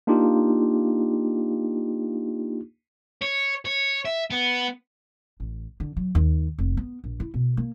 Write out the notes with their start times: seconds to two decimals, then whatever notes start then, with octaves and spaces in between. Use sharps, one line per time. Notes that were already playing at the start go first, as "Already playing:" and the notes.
0.07 A#3 D4 D#4 F4 G4
3.22 C#5
3.65 C#5
4.05 E5
4.31 B3
5.40 A1
5.80 D3
5.97 F#3
6.15 D#2
6.58 F1
6.77 B3
7.04 A#1
7.20 E4
7.34 B2
7.57 A#3